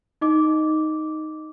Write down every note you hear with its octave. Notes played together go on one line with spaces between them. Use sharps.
D#4 D#5 D6